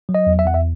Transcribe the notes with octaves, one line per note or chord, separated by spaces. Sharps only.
F#3
D#5
E2
E5
E2 F#5
E5